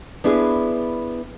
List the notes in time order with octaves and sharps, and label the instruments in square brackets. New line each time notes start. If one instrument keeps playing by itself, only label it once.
[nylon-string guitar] B3 D4 E4 G#4